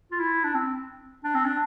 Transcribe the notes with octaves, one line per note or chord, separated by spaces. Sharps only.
F4
E4
D4
C4
D4
C4
D4